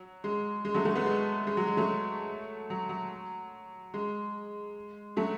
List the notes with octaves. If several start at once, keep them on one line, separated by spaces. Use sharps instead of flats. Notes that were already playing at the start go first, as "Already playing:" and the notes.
Already playing: F#3
G#3
G#3
F#3 A3
F#3 A3
G#3 B3
G#3
G#3
F#3
G#3
F#3 A3
F#3
F#3
G#3
F#3 A3